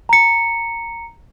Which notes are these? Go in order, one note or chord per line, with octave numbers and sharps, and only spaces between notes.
A#5 C#7